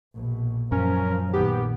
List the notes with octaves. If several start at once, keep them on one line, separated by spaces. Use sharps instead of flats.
A#1 B2
F#2 F3 C#4 A#4
A#1 D#3 B3 G4